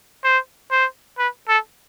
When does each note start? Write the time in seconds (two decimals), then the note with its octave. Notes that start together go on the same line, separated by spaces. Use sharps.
0.24 C5
0.71 C5
1.18 B4
1.49 A4